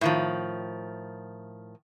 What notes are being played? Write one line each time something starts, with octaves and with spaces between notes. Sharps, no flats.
A2 D#3 F3